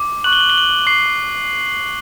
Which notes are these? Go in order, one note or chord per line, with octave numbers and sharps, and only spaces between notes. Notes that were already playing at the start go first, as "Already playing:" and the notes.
Already playing: D6
C#6 F#6 F#7
G7
F#7
G7
F#7
C#6 C7